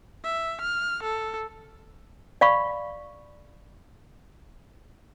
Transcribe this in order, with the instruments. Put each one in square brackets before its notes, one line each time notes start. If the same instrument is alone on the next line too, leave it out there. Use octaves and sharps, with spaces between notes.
[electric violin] E5
F6
A4
[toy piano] D5 F5 B5 C#6